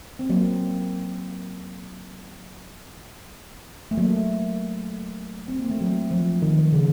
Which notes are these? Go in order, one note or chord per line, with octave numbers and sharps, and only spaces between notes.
C4
F#3 A#3
A3
F#3 A#3
C4
A#3
A3
F#3
F3
D#3
C#3